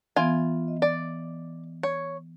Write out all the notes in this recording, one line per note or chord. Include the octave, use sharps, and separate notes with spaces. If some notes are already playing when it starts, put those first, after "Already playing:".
E3 B3 F4 G#5
D#5
D5
C#5